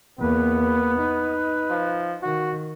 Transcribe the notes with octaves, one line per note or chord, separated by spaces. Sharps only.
E2 A#3 B3 B4
D#4
F3
D#3 F#4